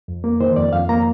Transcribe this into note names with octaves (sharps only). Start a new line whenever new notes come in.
F2
A#3
D#3 C5
F2 D5
F2 F5
A#3 A#5